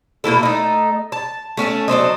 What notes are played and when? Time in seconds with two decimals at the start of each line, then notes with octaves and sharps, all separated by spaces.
0.24 B2 A#3 E4 A4
0.43 A3 D#4
1.12 A5
1.57 A3 C#4 F5 A5
1.88 F#3 D4 C5 D#5